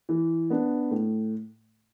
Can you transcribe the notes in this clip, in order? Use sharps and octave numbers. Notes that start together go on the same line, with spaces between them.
E3
B3 D4
A2